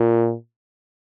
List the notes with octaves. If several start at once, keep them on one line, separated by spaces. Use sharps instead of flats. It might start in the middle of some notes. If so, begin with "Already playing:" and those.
Already playing: A#2